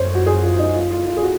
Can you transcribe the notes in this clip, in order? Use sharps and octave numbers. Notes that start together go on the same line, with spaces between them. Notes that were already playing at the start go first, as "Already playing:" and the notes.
Already playing: F#2 C5 C#5
F#4
G#4
F4
D#4
F4
F4
F4
G#4
F#4